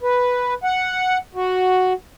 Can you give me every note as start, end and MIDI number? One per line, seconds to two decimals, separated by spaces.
0.02 0.54 71
0.64 1.18 78
1.35 1.93 66